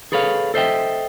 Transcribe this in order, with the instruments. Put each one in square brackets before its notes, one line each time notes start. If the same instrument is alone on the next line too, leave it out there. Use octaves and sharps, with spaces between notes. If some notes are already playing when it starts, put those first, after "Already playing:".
[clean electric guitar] G#4 A4 B4 C#5 F5
A4 C5 D#5 E5 G5